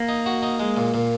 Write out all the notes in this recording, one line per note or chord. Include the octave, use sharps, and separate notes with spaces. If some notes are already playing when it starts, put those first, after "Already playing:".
Already playing: A#3
D#4
F#4
D#4
G#3
A#2
A#2